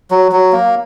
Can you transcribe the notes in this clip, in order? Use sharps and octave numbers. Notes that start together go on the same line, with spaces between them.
F#3
F#3
A#3